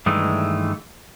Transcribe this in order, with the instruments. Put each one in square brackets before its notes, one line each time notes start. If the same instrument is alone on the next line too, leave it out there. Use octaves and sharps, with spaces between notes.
[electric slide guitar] G2 D#3 E3 G#3 A3